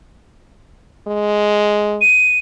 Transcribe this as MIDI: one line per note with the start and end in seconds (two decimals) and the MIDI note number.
1.07 1.99 56
2.01 2.39 99